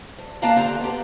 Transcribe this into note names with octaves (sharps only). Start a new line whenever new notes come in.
D2
A#3 B3 D4 F5 A5 A#5
D3 G4 C5 A#5
B3 G4